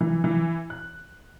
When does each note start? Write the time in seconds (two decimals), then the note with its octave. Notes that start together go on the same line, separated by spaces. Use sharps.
0.01 E3
0.24 E3
0.70 F#6